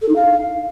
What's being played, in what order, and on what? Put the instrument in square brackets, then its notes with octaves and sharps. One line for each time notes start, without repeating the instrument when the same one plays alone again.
[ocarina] A4
D#4
F5